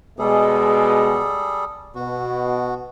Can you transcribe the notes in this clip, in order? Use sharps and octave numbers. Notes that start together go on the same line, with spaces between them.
B2 G3 G#3 G#4 A4
B2 F#4